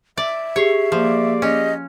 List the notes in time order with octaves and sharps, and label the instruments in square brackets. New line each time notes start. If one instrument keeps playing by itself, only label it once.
[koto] D5 [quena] E5
[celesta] G4 G#4 C7 [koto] C#5
[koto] F3 [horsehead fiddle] A#3 D5
[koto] C#4 [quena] D#5